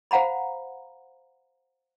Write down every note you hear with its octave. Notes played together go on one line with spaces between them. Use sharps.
C5 F5 F#5 A#5 B5